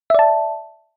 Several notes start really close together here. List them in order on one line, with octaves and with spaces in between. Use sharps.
E5 D5 A5